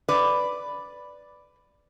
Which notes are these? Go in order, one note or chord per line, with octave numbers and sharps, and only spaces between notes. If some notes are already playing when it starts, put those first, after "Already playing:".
B4 D5